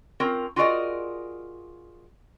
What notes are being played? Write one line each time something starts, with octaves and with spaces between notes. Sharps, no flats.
C4 C#4 F4 A#4
F4 F#4 G#4 A#4 D5 D#5